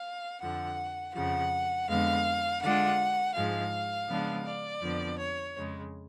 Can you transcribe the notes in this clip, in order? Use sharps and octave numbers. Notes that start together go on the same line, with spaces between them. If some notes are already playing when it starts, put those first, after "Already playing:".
Already playing: F5
F2 D3 F3 F#5
F2 C#3 F3 F#5
F2 D3 G#3 B3 F5
D3 G#3 D4 F4 F#5
G#2 F3 G#3 F5
C#3 F3 G#3 B3 D4
D5
F2 D3 F3 B3
C#5
F2 C#3 G#3